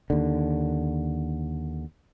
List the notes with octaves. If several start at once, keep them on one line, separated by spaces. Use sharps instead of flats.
D#2 D3